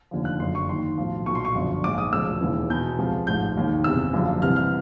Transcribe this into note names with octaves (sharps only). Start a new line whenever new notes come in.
F1 D#2 D3 F3
F#6
F#1 F#2 D3 F3 C6
C#6
D#2 D#3 C6
B1 A2 F3
B1 A#2 F3 C#6
C6
C#6
G1 F#2 D3 F3
A#1 G#2 F3 D6
D#6
E1 D2 C#3 F3 E6
E1 D#2 C#3 E3
E2 B2 G6
C#2 C3 F3
A1 G#2 F3 G6
E1 D#2 D#3
F#1 E2 C3 E6
F#1 F#2 D3 F3
C2 C3 E3 F6
F6